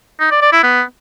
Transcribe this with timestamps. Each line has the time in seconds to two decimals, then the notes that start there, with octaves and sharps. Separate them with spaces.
0.20 D#4
0.31 D5
0.42 D5
0.52 E4
0.63 B3